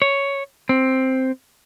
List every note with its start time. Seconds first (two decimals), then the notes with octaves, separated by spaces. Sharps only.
0.02 C#5
0.69 C4